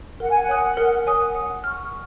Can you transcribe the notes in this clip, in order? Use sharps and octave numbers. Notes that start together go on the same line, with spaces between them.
A#4 F#5
G#5
F#5
C#5 G#5 D#6 F#6
A#4
C#5 G#5 D#6 F#6
F#5
C#6 F6